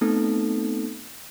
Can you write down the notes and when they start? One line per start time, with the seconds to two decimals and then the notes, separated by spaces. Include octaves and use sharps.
0.01 A3 B3 C4 D#4 A4